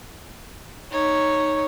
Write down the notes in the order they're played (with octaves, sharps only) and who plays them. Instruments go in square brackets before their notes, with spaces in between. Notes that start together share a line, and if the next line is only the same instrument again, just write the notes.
[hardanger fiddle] D#4 C#5